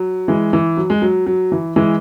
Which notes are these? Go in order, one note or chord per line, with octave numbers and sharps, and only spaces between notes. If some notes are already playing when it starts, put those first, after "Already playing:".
Already playing: F#3
E3 G#3
E3
F#3
G#3
F#3
F#3
E3
E3 G#3